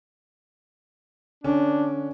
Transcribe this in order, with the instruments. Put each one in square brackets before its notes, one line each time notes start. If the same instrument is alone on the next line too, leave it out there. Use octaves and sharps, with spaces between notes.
[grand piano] D3 C#4 [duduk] D4